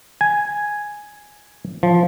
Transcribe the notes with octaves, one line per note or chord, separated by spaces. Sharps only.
G#5
F3